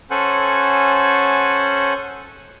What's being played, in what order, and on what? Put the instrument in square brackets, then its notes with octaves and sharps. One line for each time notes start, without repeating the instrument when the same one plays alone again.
[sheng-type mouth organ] C#4 A4 C5 F#5 G#5